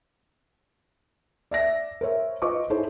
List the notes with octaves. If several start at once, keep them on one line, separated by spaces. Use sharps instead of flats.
D5 E5 A#6
A#4 C5 C#5 E5
F4 B4 C5 D#5 C#6 D6
D#4 E4 G#4 A4 C5 C#5